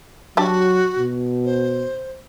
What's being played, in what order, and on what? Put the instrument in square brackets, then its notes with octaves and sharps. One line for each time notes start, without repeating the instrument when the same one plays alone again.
[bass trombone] F#3 [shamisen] D4 G4 A5 [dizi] F#4
[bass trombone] B2
[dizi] C5